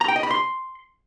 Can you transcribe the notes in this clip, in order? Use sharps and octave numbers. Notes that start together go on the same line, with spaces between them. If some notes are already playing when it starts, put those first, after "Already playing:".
A#5
G5
D#5
B5
C6